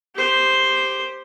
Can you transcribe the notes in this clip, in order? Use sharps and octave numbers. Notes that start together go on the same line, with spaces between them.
G4 C5